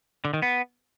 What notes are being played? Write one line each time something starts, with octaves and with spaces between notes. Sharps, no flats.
D3
D#3
B3